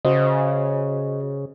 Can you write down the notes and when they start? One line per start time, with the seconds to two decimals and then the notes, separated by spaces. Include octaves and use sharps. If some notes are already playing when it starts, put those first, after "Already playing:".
0.05 C#3 F#4 C5 D#5